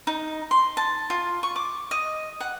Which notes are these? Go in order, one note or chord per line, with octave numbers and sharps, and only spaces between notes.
D#4
C6
A5
F4
C#6
D6
D#5
F#5